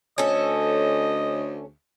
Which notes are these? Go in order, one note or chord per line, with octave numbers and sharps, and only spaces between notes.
D2 C#4 A4 D#5